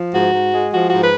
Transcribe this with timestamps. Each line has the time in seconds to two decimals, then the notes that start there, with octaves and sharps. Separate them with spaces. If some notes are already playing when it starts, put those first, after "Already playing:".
Already playing: F3
0.13 G#2 F#4
0.33 G#2
0.52 G#3
0.73 F3 F#4
0.88 G#2 F#4
1.02 B4